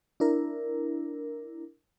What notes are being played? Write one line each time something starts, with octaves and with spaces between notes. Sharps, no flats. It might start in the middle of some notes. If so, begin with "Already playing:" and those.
D4 E4 A#4